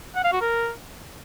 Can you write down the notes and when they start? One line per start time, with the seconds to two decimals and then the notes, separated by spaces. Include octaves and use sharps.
0.16 F#5
0.24 F5
0.32 F#4
0.41 A#4